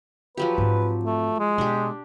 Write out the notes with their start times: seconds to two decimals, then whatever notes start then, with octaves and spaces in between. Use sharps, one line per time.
0.37 F3 F#3 G4 B4
0.58 G#2 C4
1.05 A3
1.39 G#3
1.58 B2 D4 G4